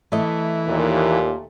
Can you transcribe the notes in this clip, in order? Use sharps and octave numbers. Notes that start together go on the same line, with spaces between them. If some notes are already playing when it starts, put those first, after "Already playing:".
E3 A3 D#5
D#2 A#2